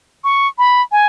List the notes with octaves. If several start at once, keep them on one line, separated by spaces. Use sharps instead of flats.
C#6
B5
G#5